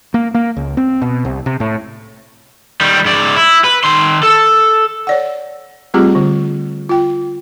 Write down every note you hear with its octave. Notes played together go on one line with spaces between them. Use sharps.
A#3
A#3
C#2
C4
B2
C2
C3
A2
D#3 G3
G#2 D5
E4
B4
D#3 C6
A4
C#5 D5 F#5
G3 A3 C4 F4 G4 G#4
D3
F4 G5